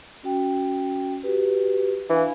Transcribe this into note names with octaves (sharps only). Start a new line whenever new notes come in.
C#4 F#4 G5
F#4 G4 B4
E3 D4 F5 G#5